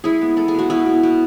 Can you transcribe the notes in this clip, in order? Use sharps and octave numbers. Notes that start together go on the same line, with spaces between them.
G#3 E4 G#4
B3
G#3 A4
G#4
B2 F#4
B2 E4 G#4
B2
B2